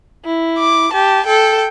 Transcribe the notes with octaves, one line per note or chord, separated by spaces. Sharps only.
E4
D6
G4 A5
A4 G5